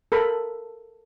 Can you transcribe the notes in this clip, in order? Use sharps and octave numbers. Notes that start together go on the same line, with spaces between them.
A4 A#4 B5